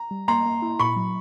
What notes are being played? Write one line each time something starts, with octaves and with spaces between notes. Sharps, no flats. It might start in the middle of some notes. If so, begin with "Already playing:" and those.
Already playing: A#5
G3
A#3 A#5 C6
A#3
E4
A#2 B5 C#6
F#3